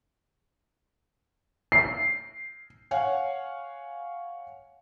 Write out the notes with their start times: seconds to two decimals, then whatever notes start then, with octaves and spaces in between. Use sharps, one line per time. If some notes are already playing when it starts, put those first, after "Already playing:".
1.72 C7
2.91 C#5 F5 F#5 G#5